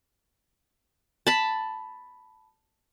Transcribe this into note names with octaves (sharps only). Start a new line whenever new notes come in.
A5 B5